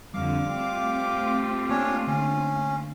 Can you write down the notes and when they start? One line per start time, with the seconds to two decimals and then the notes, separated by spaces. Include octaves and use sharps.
0.14 F2 D3 G3 C4 F5 D6
0.48 A3 C4 F4 G4
1.70 A#3 C#4 D4 C#5
2.07 D3 C#4